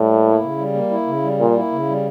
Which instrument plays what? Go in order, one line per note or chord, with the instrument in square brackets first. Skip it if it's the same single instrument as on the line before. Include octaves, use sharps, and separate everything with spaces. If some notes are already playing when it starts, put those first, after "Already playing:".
Already playing: [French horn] A2 [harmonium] G3
[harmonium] A#3
E4
C#3
G3
A#3
E4
C#3
G3
[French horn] A#2 [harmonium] A#3
[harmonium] E4
C#3
G3